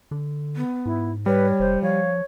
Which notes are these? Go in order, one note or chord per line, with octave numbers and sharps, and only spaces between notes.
D3
B3
G#2 E4
G3 B4 C#5
F1 C5
F3 C#5 F5